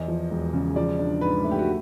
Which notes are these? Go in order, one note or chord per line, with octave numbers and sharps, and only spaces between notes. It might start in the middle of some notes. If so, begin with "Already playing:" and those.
Already playing: E2 D#5
F3
E1
C#3
F3 D5
D4
G#2 B4
A3
G4
F#4